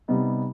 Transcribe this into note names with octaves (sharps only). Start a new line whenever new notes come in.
C3 G3 B3 D#4